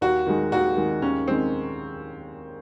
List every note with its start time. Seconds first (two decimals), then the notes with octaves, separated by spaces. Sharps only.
0.01 D#2 F#4
0.27 D#3 G#3
0.52 D#2 F#4
0.77 D#3 G#3
1.02 D#2 C#4
1.28 D#3 G#3 C4